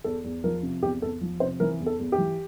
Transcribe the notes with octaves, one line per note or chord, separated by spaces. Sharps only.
E2 A4
E2
F3 A#4
C3
E2 G4
E2 A4
F3
C3 C5
E3 A#4
E2
A4
E2
G4
E3